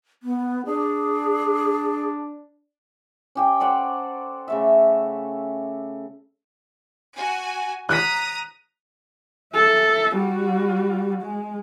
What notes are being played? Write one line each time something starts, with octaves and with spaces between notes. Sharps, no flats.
B3
D4 G#4
C#4 G4 G5
A4 C5 D5 F#5
C#3 A3 E5
F#4 G#5
A#5 D#6 F#6 B6
A4 E5
G3 F#4
G#3